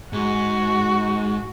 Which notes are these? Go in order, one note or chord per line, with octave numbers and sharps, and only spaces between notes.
G#2 F#4